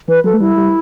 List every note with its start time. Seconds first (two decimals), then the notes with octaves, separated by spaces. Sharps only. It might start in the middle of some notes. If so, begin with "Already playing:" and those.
0.08 E3 B4
0.24 F#3 A4
0.34 A3
0.40 G3 E4
0.57 G3